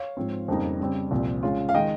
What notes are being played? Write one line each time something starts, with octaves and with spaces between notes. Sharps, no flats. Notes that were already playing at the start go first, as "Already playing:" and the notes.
Already playing: C#5 F5
G#2 F3 C4
F2 C#3 G3 A#3 D#4
C#3 G3 C4
C2 A#2 F3 C4
C#3 G#3 C#4 F4
F5
D#3 G#3 D#5 G5